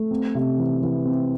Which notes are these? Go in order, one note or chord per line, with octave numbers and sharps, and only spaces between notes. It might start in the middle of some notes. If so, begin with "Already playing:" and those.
Already playing: A3
C4
C3
E3
E3
C4